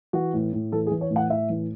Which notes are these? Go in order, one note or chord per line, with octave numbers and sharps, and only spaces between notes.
E3 F#4
A2
A2
E3 A4
G#4
E3
C#5
A2
F#5
A2 E5
E3